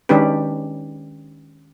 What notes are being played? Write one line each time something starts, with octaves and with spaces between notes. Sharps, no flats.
D#3 G#3 C#4 D4 G4 B4